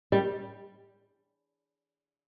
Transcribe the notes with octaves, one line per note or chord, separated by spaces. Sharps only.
G3